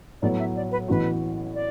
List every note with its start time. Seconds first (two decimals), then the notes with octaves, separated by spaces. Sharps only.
0.22 A2 F#3 B3 D5
0.39 E5
0.56 D5
0.72 B4
0.88 A1 A2 E3 B3 F#4 B4
1.54 D5